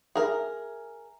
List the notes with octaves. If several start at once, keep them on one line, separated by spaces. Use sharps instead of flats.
G#4 A#4 E5